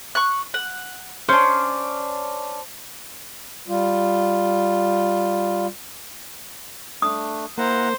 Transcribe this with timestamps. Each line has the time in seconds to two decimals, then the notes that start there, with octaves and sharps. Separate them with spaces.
0.15 C#6 F#6
0.54 F#5
1.29 C#4 D4 C5
3.68 G3 F4
7.02 A3 D4 D#6
7.58 A#3 E4 C5 F#5 A#5